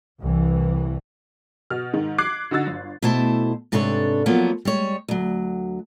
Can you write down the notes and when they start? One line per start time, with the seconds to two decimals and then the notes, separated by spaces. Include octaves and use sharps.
0.20 C2 E3
1.70 B2 F6
1.93 G#2 D#3 G#3
2.18 D6 F#6 G#6 C7
2.51 D3 D#4 F#4 E6 A6
2.67 G1
3.02 B2 A3 E4 C5 A5
3.72 G#2 C3 D4 A4 B4 C#5
4.26 F3 F#3 A#3 B3 A4
4.65 G3 G#3 C#5
5.08 D2 F#3